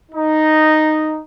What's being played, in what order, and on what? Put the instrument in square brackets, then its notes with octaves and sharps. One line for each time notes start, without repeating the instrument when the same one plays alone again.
[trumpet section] D#4